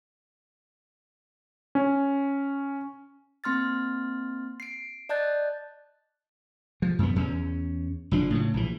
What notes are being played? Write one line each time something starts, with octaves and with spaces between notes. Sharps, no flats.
C#4
A#3 C4 C6 F6 A6
C7 D7
D5 D#5 A5 F#6 G6 A6
F3
F#2 B3
E2 C#4
F#1 F3 D4
A2 C#3
A#1 E3